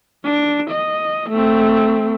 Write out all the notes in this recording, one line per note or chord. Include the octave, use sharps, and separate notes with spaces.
D4
D#5
A3 C4